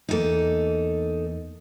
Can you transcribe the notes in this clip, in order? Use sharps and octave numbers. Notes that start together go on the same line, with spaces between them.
E2 A#3 D#4 A4